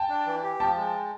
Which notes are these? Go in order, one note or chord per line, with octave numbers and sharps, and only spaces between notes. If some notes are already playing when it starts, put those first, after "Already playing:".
Already playing: G5 A5
D4
E3
G4
F3 G5 A5
G#3